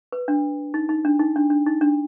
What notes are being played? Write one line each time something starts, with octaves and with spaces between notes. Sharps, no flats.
B4
D4
D#4
D#4
D4
D#4
D4
D4
D#4
D4